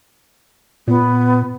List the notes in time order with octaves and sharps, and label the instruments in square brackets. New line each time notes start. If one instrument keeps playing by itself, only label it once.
[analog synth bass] A#2 [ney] B3